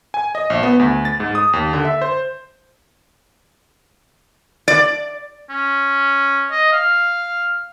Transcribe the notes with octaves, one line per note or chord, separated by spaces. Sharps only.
G#5
D#5
A#1
B3
D2
A6
G#2
D#6
D#2
D3
E5
C5
D5
C#4
D#5
F5